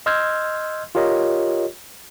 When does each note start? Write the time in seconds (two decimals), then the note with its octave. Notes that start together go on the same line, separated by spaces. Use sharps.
0.06 D#5 C6 E6 F6 G6 G#6
0.95 F4 G4 A#4 C#5 D#5